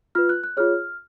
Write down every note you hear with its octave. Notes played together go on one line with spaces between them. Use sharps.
F4 B4 F6
F#6
F#6
F4 G#4 C#5 F6